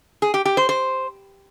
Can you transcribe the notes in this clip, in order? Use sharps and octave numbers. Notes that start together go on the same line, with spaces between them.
G#4
G4
G4
C5
C5